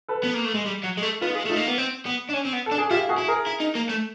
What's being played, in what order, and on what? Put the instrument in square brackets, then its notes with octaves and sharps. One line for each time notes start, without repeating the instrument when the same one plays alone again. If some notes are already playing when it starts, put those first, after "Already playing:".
[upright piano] A4 B4
[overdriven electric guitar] B3
A#3
A3
G#3
G3
F#3
G#3
A3
[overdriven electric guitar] B3 [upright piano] D#4 F4
[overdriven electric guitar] G#3
[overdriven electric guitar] A3 [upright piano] D#4 F4
[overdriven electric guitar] A#3
B3
C4
B3
D4
C#4
C4
B3
[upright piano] A4
[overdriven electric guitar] D4
[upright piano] G#4
[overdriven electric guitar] E4 [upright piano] F4 G4
[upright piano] F#4 G#4
[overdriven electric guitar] E4
[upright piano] G#4 A#4
[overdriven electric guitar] E4
D#4
A#3
A3